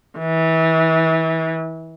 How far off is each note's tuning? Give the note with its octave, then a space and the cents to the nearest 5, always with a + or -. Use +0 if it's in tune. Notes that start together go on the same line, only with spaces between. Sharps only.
E3 -25